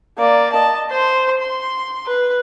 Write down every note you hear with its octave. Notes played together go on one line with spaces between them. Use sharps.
A#3 D5
D#5 A5
C5 C6
C6
B4